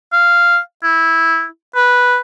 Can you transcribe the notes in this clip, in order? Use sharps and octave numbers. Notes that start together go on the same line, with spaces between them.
F5
E4
B4